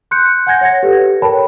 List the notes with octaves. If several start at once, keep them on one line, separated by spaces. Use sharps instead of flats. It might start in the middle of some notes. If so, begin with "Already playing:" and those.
C6 F#6 G6 C#7
F#5 G#5 G6 G#6 A#6 C#7
C#5 F#5 G#6 A#6
G4 A4 B4
A#4 C#5 G5 A5 B5